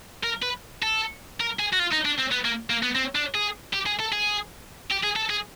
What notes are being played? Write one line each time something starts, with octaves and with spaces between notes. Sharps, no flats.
A#4
B4
A4
A#4
G#4
F#4
F4
D#4
D4
C4
B3
A#3
A#3
B3
C4
D4
G#4
G4
G#4
A4
G#4
G4
G#4
A4
G#4